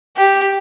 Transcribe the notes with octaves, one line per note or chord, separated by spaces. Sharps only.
G4